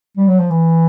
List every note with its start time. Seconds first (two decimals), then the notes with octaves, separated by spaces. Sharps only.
0.17 G3
0.28 F#3
0.39 F3
0.51 E3